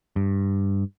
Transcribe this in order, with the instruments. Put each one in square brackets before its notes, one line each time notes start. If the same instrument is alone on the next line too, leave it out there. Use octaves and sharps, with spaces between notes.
[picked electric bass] G2